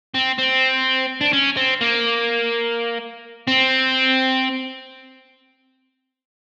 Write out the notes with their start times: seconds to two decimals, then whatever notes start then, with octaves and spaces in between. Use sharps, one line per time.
0.14 C4
0.38 C4
1.21 D4
1.33 C#4
1.57 C4
1.81 A#3
3.47 C4